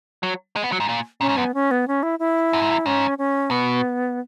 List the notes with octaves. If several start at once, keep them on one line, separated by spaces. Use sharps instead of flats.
F#3
G#3
B3
F#3
G#2
A#2
A#2 C#4
G#2
F#2 B3
C#4
B3
C#4
E4
E4
F#2
G#2
F#2
G#2 C#4
C#4
B2 B3